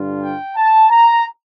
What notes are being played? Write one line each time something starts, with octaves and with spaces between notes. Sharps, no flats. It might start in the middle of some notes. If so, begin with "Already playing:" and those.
Already playing: G2 D3 G3 D4 F4
G5
A5
A#5